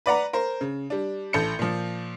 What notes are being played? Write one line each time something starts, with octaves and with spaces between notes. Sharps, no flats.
B4 D5 F#5 A#5
A#4 C5
C#3
G3 D4
A1 A4 G6 C#7
A#2 F3